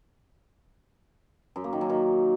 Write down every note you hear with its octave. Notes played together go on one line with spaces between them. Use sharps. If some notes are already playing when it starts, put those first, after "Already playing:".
F#2
A#3
D#3
F#2
D#3